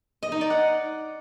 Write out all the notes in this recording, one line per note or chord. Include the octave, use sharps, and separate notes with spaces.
D#5
D#4
D5
F#5